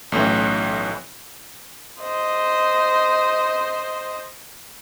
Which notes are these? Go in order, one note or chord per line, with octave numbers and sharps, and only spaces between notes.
B1 A2 E3 C#4
C5 D#5